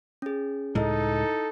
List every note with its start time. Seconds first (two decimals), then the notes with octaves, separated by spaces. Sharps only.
0.22 C#4 G#4
0.75 C#2 A2 G#3 D#4 E4 A4 D#5